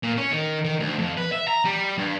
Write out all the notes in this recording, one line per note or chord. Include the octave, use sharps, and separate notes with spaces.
A#2
C#4
D#3
D#3
D2
F2
B4
E5
A#5
G3
G2